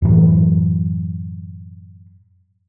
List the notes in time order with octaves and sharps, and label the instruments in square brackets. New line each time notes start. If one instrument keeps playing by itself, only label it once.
[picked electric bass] F#2 A2 E3 F#3